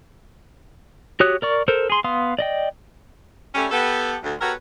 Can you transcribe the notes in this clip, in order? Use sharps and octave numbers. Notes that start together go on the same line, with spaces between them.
F#4 G4 C#5 D#6 F#6
A#4 D5 C#6
A4 A#4 C5
G#4 C6
B3 F5 C6 D#6
D5 D#5 G5
G3 A3 C#4
B3 G4 A4
D2
B3 F#4 G4 A4 A#4 C#5